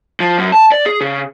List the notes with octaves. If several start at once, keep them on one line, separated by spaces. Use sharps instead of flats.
F3
F#2
A5
D5
G#4
C#3